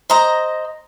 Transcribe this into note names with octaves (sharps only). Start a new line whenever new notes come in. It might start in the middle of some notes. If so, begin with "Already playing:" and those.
C5 D#5 A#5